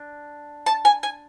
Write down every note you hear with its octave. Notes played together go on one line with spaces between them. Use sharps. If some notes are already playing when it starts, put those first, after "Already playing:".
Already playing: D4
A5
G#5
G#5